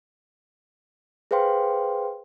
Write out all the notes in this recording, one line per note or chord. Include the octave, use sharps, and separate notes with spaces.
G#4 B4 C5 F5 G5 C6